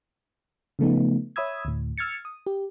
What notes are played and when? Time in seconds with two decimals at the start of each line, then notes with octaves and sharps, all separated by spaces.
0.79 C#3 F3 A3 B3 D#4
1.36 C#5 E5 B5 D#6 E6 G#6
1.65 D2 A2
1.98 E6 F6 G#6 A6 C#7
2.25 D#6
2.46 G4